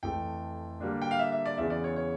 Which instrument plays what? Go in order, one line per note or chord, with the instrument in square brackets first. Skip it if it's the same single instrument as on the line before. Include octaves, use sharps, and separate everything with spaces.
[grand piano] F2 E3 A3 G5
D3 G3 A#3 D4
G5
F5
E5
E5
D5
E2 C#3 E3 E5
D5
C#5
C#5